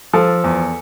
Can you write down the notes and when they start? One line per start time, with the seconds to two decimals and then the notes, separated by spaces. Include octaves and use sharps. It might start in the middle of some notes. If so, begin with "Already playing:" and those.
0.13 F3 A4
0.44 E2